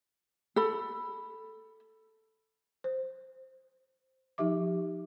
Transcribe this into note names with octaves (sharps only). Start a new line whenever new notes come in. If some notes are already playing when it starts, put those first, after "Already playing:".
A4 B5
C5
F3 D#4 G4 E5 D6